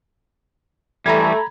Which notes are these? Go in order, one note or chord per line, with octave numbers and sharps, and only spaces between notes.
E3 G3 A3 A#5 B5 G#6